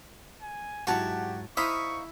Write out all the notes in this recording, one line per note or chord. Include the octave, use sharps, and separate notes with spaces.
G#5
G#2 F#3 E4 F#4 G4 C#5 F#5 A5
D#4 E4 C5 F5 B5 C#6 D#6